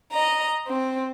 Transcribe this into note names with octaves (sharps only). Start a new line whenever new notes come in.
D#5 A#5
C4